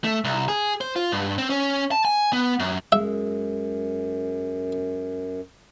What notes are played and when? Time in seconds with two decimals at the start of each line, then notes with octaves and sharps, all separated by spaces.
0.04 A3
0.24 C2
0.48 G#4
0.81 C5
0.96 F4
1.12 G2
1.38 C4
1.50 C#4
1.91 A5
2.05 G#5
2.33 B3
2.60 F#2
2.92 F#2 G#3 E5